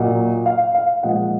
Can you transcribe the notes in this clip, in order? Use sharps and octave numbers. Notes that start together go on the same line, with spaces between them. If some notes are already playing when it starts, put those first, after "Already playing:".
Already playing: A#2 F#3 D#5 F#5
F5
F5
A#2 F3 G#3 D#5 F#5